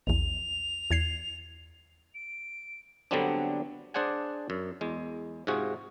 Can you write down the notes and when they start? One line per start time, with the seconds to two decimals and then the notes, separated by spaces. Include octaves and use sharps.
0.07 A#1 E2 F7
0.91 E2 G#6 C7
2.15 D7
3.11 D3 F#3 G3 B3 C4 D4
3.94 D4 G#4 C5 D5 F#5 G#5
4.50 F#2
4.81 E2 G#3
5.47 G#2 C3 F4 F#4 G#4